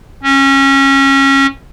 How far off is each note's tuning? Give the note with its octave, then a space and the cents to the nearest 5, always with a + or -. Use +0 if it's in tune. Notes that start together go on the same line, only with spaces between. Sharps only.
C#4 -25